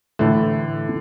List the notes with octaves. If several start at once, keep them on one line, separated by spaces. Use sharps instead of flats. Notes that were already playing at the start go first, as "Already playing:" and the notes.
A2 D3 E3 A3